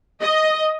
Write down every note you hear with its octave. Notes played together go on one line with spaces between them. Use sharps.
D#5